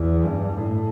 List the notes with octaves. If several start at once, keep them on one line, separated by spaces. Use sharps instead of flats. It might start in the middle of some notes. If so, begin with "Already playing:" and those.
Already playing: E2
G2
A2